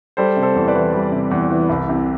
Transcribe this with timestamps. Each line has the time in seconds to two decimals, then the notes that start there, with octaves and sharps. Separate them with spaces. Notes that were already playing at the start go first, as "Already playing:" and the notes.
0.17 G3 A4 C5
0.36 C3
0.42 A4 C5
0.55 E2
0.68 B4 D5
0.75 E3
0.93 G3
1.12 C3
1.31 E2
1.51 E3
1.69 C2
1.89 C3